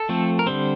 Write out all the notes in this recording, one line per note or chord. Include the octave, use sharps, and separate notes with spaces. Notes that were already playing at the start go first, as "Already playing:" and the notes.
Already playing: A4
F3 A3 C4
A#4
D3 G3 C4 C5